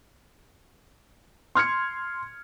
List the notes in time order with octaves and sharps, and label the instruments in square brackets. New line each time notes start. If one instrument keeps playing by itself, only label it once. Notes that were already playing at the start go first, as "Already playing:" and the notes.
[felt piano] C6 F6 G#6 C#7